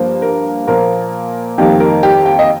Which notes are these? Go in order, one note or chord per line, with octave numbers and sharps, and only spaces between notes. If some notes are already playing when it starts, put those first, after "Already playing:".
Already playing: G2 F3 A#3 C5
A#4
A#2 F3 A#3 A#4
F2 D#3 G3 A#3 G4
A#4
G4
G5
D#5